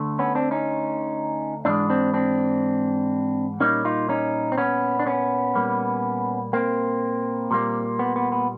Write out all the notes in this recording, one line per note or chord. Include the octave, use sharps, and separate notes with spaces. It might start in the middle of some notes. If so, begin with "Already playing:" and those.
Already playing: D2 D3 A3
B3 C#4
C4 D4
C#4 D#4
G#2 E3 G#3 C4 D4
C4 D4
C4 D4
A#2 G3 A#3 C#4 D#4
D#4 F4
C#4 D#4
C4
B3 C#4
D4
B3 C#4
A#2 G3 A#3
A#3 C4
A#2 G3 A#3
B3
B3
B3